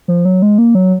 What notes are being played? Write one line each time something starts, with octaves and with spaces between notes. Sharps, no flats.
F3
F#3
G#3
A#3
F#3